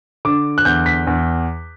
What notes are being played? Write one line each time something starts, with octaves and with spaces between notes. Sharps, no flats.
D3 D6
F#6
E2 G6
B6
E2